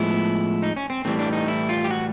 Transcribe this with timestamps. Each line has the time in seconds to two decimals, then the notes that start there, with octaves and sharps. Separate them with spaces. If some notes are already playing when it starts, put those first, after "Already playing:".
Already playing: A2 F3 G#3 B3 E4
0.62 D#4
0.76 C#4
0.90 C4
1.05 A2 E3 G3 C4
1.19 D4
1.33 D#4
1.48 E4
1.69 F4
1.84 G4
1.91 F#4